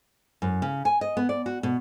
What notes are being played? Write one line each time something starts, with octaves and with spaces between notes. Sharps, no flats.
F#2
C#3
G#5
D#5
B3
D5
F#4
B2